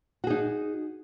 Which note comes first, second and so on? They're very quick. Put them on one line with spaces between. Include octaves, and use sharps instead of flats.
F#4 G#4 D#4